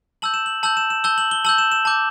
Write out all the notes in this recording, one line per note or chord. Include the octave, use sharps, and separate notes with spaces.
A5 E6 G6 F#7
E7
F#7
A5 E6 G6 F#7
E7
E7
A5 E6 G6 G7
F#7
G7
A5 E6 G6 F#7
E7
E7
A5 D6 G6